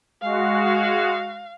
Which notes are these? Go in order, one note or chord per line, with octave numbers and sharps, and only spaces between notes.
G#3 F#4 F5